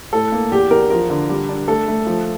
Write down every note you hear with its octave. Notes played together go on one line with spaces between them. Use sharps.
A2 A4
A#3
E2 G4
E2 A#4
F3 A#4
D3
G3
D4
A3 A4
A3
F3